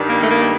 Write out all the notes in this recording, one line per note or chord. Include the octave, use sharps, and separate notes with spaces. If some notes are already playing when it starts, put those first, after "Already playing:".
Already playing: G2 D#3 G3
A#3
A3
A#3